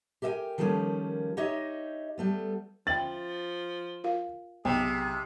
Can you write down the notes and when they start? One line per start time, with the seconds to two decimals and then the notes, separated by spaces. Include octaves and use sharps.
0.22 G4 A#4 D#5 E5 G5 G#5
0.58 D#3 F3 G3 A3 A#3 C#4
1.37 D#4 G4 C#5 D#5 E5
2.18 G3 A3 B3
2.87 F3 C#4 E5 G5 A6 F#7
4.04 F4 A#4 F5
4.65 B1 C3 G#4 G5